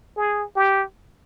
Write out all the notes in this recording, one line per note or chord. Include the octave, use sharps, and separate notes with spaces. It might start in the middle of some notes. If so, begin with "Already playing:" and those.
G#4
G4